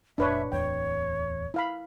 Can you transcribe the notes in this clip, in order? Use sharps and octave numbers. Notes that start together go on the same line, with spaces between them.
F1 A#2 D4 B4 C#5 E5
D1 E2 C#5 G5
E4 F5 B5